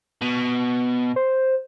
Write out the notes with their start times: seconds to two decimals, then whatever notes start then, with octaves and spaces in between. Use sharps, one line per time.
0.21 B2
1.16 C5